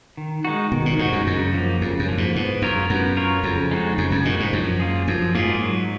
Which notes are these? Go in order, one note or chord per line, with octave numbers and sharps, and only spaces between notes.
D#3
G#3 D#4 F#4
B2 D#3
A#2
G#2 G#3 D#4 F#4
F#2
F#2 C#3
F3 A#3
F2 C#3
F#2
F3 A#3
G#2
G#2 B3
F#2 F4 A#4 C#5
F#2 B3
F4 A#4 C#5
F2 C#3
G#3 D#4 F#4
F2 C#3
F#2
A#2 G#3 D#4 F#4
G#2
F#2 F3
A#3 F4 G#4
F#2 F3
G#2 A#3 F4 G#4
F#3